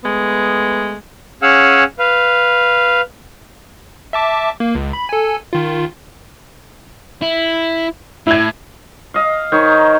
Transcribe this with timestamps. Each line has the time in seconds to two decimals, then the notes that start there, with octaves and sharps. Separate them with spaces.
0.04 G#3 A3 B3
1.42 C#4 G#4 F5 F#5 E6
1.99 B4 F5
4.13 E5 A5 D6
4.60 A#3
4.75 C#2
4.93 B5
5.09 A4 G#5
5.53 D#3 F4
7.22 E4
8.27 A2 E4 G#6
9.14 D#5 F5
9.52 D#3 D#4 C5 C#5